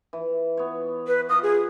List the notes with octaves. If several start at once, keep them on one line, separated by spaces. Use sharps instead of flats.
E3
B3 C#5
B4
F4 D#6
G#4